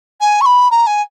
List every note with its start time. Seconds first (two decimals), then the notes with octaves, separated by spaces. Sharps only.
0.21 G#5
0.41 C#6
0.46 B5
0.71 A#5
0.87 G#5